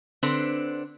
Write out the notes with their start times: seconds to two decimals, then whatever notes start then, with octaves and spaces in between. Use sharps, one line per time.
0.23 D3 C4 D4 B4 C5